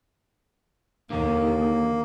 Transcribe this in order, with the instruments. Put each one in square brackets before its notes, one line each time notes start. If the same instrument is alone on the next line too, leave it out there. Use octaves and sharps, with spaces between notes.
[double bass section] D#2 [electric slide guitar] D3 D#3 [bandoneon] A#3